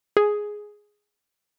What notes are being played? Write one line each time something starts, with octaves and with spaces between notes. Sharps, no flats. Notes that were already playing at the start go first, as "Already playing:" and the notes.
G#4